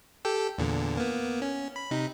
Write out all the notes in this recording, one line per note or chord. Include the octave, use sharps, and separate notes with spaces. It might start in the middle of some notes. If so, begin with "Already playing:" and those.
G4 A4 G5
E2 A#2 D3
A#3 B3
C#4
B5
C3 D#4